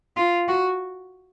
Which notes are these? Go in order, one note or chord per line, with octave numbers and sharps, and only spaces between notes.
F4
F#4